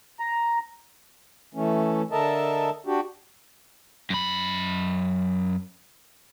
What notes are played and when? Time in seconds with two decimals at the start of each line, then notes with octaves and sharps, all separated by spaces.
0.20 A#5
1.54 E3 A3 C#4
2.12 D3 A4 A#4 D#5 E5 A5
2.86 D4 F#4 G4
4.10 F#2 B5